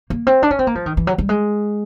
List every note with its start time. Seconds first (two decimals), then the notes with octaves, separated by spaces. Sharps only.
0.10 A#3
0.27 C4
0.43 D4
0.51 C#4
0.59 C4
0.67 A#3
0.75 F3
0.86 D#3
0.97 E3
1.07 F#3
1.18 G3
1.29 G#3